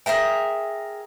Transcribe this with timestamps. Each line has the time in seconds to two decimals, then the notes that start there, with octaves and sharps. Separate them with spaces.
0.06 G#4 A#4 E5 G5